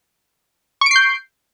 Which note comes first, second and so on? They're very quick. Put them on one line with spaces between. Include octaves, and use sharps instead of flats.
C#6 D7 C7 G6